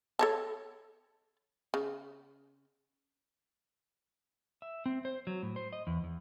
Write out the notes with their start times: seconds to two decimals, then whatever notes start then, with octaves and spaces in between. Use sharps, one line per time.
0.19 A4 C#5 A5
1.74 C#3
4.62 E5
4.86 C4
5.05 C5
5.27 F#3
5.43 A2
5.56 C5
5.73 D#5
5.87 E2
6.04 E2